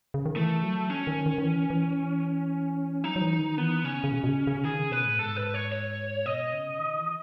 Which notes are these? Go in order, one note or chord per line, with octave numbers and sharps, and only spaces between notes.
C#3
D#3
E3 A3
F#3
C#4
D#3
D#3
D#3
E3
E3
F#3 D#4
F#3
E3
D#3
E3 B3
C#3 C#4
C#3
B2
B2
C#3
C#3
D#3 G#4
C#3
B2 B4
A2
G#2 A4
B4
C#5
C#5
B2 D#5
C#3
D#3
E3